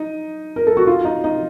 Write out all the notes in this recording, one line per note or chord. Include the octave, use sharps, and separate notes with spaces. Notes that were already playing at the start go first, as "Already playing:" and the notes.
Already playing: D#4
A#4
A4
F#4
F4
D#4
D#4